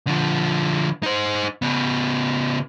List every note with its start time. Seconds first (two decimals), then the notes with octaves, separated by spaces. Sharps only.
0.07 D3 F3
1.03 D#4 C5
1.62 C#3 B3